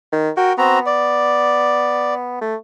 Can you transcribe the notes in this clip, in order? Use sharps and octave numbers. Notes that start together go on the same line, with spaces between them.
D#3
F#4 A#4 G5
B3 C4 F#4 A#5
D5
A3